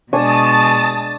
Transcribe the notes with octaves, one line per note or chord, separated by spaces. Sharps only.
B2 G#3 D4 G#5 A5 C#6 D#6 A6